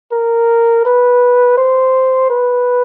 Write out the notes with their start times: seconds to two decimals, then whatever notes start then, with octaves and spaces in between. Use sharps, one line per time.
0.12 A#4
0.85 B4
1.58 C5
2.30 B4